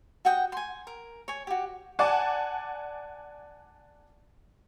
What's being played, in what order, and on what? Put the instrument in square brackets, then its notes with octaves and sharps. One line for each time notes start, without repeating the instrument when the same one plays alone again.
[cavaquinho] F#4 F#5 G5 D#6
G#5 C6
A#4
C#5 G#5
F#4 G4
[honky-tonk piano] D5 F#5 G#5 A5 D6